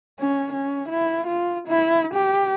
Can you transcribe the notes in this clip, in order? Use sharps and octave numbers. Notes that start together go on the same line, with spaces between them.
C#4
C#4
E4
F4
E4
G4